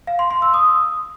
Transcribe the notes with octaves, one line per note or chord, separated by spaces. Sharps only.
F5
C6
C6
E6
D#6